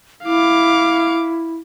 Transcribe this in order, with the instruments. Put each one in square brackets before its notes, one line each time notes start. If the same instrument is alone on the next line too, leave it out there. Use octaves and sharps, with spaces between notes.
[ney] E4 [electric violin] F5 D6